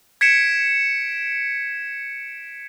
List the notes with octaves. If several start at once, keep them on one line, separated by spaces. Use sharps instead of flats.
G#6 B6 C#7 D7 E7